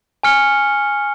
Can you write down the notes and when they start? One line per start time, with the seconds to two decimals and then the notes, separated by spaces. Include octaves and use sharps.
0.23 G#5 C#6 F6 C#7 G7